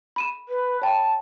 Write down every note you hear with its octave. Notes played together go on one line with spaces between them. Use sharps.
B5 D#7 E7
B4
C#5 G5 A5 B5